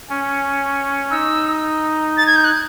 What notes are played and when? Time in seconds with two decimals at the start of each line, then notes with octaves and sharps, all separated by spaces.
0.10 C#4
1.11 D#4 E6
2.17 A6
2.26 G#6
2.36 G6
2.44 F#6